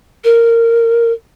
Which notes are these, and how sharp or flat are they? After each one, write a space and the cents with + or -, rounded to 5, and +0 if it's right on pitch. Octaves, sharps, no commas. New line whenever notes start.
A#4 -15